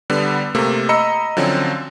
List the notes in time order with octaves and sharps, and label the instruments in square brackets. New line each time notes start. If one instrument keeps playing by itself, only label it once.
[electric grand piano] D3 G3 B3
C3 A3 A#3
D#5 A#5 B5 E6 C#7
D3 F3 F#3 C4 C#4